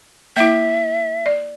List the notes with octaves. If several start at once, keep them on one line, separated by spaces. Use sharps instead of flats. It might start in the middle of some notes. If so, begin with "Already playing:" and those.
A#3 E4 E5
D5